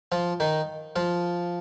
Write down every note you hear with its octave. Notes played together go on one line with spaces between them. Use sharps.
F3 F4
D#3 D#4
F3 F4